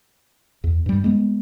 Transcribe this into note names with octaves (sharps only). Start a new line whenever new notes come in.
E2
G2 G3
G#3 A#3 B3